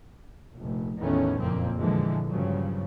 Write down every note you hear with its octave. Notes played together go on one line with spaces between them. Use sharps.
F1 A#1
A1 E2 D#3 A3 B3 C#4
F#1 F2 A#2 F3 A#3 C4
A#2 D3 E3 F3 G#3
G2 A#2 C#3 F3 F#3